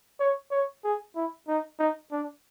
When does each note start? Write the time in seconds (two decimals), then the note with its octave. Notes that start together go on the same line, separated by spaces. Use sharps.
0.20 C#5
0.51 C#5
0.84 G#4
1.16 E4
1.48 D#4
1.79 D#4
2.12 D4